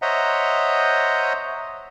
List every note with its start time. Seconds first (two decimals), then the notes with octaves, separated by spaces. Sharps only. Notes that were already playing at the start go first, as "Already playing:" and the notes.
0.02 C5 C#5 D#5 E5 F#5 A#5